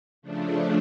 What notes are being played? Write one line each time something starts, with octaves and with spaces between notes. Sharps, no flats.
C#3 F3 A3 D4